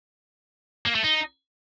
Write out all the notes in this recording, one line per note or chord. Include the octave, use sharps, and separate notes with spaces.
A#3
A3
D#4